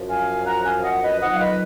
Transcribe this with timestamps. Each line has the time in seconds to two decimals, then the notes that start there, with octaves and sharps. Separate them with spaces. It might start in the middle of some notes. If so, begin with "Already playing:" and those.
Already playing: F#2 F3
0.09 F5 G#5
0.46 F#5 A#5
0.65 F5 G#5
0.84 D#5 F#5
1.03 B4 D#5
1.21 F2 D#3 F#3 D#5 F#5
1.34 F5
1.40 B4 D#5